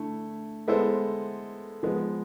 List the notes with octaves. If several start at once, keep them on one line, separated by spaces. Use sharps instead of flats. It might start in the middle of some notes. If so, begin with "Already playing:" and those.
Already playing: D3 A3 E4
G#3 B3 E4 A4 C5
F3 G#3 B3